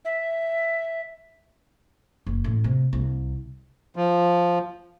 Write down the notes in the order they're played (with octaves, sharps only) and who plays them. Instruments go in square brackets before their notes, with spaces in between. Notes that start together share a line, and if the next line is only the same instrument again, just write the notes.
[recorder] E5
[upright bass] F#1
A1
C3
C2
[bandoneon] F3